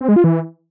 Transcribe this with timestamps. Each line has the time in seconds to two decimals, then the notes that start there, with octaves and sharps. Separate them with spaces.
0.01 C4
0.08 G#3
0.16 F4
0.24 E3